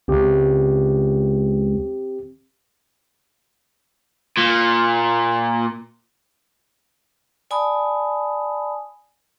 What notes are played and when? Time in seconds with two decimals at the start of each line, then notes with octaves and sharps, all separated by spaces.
0.08 C#2 C4 G4
4.37 A#2
7.51 D5 G#5 A5 B5 D#6